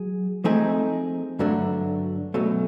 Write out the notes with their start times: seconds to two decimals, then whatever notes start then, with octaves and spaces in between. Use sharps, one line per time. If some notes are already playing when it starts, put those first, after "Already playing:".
Already playing: F#3 G#4
0.44 F3 A3 C4 D#4 G#4
1.39 G2 D3 F#3 A3 D4
2.34 B2 F#3 A3 C#4